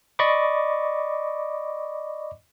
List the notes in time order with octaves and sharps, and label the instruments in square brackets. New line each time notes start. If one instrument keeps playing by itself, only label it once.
[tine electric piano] D5 D#5 B5 C#6 D6